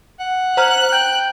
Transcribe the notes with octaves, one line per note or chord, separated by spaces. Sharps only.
F#5
C5 A#5 F6 F#6
G5 G6